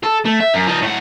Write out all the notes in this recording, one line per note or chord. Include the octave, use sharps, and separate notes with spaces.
A4
A3
E5
F#2
F3 D#4
A2 F#5